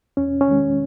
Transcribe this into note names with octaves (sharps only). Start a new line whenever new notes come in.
E2 C#4
C#4
D#3 G#3